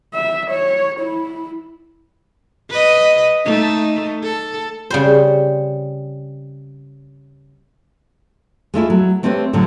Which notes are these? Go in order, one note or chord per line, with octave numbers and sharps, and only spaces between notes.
E5
C#5
E4
B4 D#5
A3 D#4
A4
C#3 G3 C5
G#3 A3 E4 F4
F#3
A3 C4 E4 G4 B4 C#5
A2 D3 F3 F#3